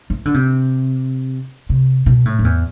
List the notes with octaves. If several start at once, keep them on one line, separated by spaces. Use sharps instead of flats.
E3
D3
C3
C3
B2
A2
F2
E2